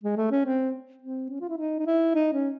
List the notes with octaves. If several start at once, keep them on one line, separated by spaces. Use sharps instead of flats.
G#3
A3
C#4
C4
C4
C#4
F4
E4
D#4
D#4
E4
D#4
C#4